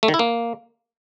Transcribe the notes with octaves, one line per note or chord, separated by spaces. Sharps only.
A3
D#3
E4
A#3